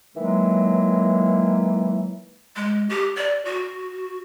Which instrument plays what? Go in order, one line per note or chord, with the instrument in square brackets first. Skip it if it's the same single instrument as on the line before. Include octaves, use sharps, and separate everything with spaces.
[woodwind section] D#3 E3 F#3 G#3 A#3
[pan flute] G#3
G4
D5
F#4